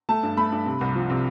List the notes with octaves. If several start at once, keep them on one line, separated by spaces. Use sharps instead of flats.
A3 A5
G2
A3 B5
G2
C3
C2
F3
C3